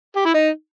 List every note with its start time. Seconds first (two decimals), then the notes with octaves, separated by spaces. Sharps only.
0.16 G4
0.25 E4
0.34 D#4